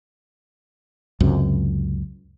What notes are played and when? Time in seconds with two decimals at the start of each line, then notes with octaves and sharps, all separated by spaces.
1.20 C#2 F#2 C3